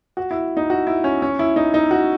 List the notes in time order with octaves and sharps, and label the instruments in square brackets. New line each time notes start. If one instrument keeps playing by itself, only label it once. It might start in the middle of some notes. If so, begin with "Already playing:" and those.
[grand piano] F#4
E4
D#4
F#4
E4
C#4
C#4
E4
D#4
D#4
F#4